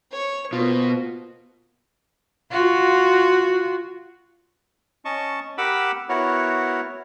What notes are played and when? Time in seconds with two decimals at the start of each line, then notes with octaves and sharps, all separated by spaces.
0.11 C#5 C#6
0.53 B2 A#3 F4 C5
2.51 F4 F#4
5.05 C#4 D#5 A5 C#6
5.58 G4 A#4 F#5 B5 D6 E6
6.09 B3 E4 F#4 A#4 C#5